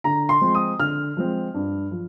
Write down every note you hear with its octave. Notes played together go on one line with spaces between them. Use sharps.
D3 A#5
C6
F3 G#3 C4
D#6
D3 F6
F3 G#3 C4
G2
F3